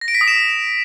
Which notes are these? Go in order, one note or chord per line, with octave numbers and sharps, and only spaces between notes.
A#6
D7
B6
D#6
E7